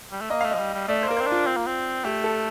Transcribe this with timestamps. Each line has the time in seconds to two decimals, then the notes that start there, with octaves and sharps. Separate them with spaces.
0.12 G3
0.21 A3
0.30 A#3 D#5
0.41 A3 F5
0.51 F3 D#5
0.60 G3
0.74 G3
0.88 A3 D5
1.03 C5
1.08 A#3 A#4
1.17 C4 C5
1.27 D4
1.32 F4
1.47 C4
1.56 A#3
1.67 C4
2.04 A3 G4
2.24 A4